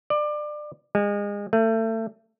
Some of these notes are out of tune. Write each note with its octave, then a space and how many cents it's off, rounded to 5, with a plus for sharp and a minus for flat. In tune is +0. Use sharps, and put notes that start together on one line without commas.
D5 +25
G#3 -30
A3 +30